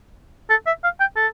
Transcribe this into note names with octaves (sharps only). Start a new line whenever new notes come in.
A4
E5
F5
G5
A4